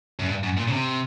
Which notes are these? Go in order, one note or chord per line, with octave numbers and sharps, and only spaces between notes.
F#2
G2
F#2
A#2
C#3
C3